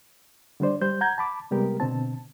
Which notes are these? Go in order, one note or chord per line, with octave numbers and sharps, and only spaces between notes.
D3 G3 D4 C5 D5
G3 C5 G6
F#5 A#5 G6 G#6
A5 B5 D6
C3 G3 G#3 B3 G4 A#4
B2 D3 C4 A5